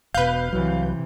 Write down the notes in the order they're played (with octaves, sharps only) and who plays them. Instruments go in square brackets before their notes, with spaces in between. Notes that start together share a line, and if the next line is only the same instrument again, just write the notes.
[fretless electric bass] E1 B2 [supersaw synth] B4 G6 [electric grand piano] F5
[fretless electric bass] C2 F#3 [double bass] C3 E3